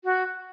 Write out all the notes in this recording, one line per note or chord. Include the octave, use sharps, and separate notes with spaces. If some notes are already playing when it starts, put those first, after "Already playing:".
F#4